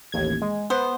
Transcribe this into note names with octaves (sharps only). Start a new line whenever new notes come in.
A1 D#2 G#6
G#3
B3 C5